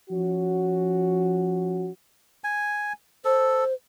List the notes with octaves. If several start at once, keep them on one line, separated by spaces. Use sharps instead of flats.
F3 C#4 F#4
G#5
A4 C5